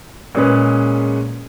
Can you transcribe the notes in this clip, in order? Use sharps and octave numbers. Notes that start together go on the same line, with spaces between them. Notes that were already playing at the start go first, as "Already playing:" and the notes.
A#2 G#3 C#4 G#4 B4